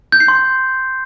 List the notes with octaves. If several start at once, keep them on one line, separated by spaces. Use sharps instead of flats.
G6
C7
C6